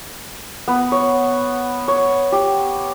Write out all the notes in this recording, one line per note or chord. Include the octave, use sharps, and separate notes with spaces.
B3
C#5
C#5
G4